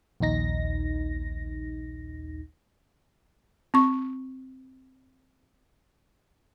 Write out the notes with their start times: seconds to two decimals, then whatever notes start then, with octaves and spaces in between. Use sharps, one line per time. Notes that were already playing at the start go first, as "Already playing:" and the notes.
0.20 A#1 D#2 D#4 A#6
3.74 C4 C#6